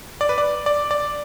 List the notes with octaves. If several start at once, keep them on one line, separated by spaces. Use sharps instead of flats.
D5
B4
D5
D5
D5